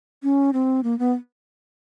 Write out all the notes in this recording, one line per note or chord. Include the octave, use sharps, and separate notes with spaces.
C#4
C4
A#3
B3